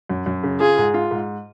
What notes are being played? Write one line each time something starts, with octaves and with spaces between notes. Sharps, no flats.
F#2
F#2
C#3
F4 G#4
G#2
F4
G#2